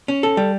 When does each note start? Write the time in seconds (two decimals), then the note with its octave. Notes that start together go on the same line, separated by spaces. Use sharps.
0.08 C#4
0.23 A4
0.37 G3